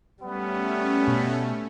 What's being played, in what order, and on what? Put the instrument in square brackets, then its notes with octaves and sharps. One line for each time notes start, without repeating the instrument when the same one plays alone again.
[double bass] G3 [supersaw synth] A3 C#4 [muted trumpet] B3
[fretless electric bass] B2